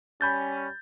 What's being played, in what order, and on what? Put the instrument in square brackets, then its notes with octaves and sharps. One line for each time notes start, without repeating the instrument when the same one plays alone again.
[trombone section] G3 C#4 [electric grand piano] B5 G6 A6